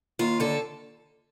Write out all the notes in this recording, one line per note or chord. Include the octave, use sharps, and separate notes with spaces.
D#2 F4
D3 A4